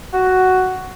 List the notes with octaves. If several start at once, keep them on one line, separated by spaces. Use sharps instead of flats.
F#4